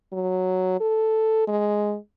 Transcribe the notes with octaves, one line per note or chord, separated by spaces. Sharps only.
F#3
A4
G#3